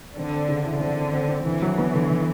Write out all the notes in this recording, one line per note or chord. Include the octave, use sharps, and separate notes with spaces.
D3 C4
C4
C#3
E3
D3 C4
C4
C4
C4
D3 E3
F#3
B3
D3
D3